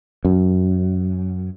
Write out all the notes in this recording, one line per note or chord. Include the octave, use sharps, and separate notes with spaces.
F#2